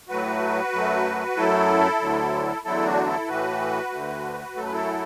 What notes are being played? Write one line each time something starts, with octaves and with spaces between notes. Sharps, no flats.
A2 F#3 A3 F#4 B4
F#2 F#3 A3
F#2 F#3 A3 E4 A4
D2 D3 F#3
E2 D3 F#3 A3 E4 A4
D4 F#4
E4 A4
A2 E3 A3 F#4 B4
D2 D3 A3
F#2 F#3 A3 A4
B4
E4 A4